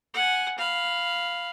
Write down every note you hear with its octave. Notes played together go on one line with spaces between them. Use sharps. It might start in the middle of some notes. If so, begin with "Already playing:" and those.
F#5 G#5
F5 B5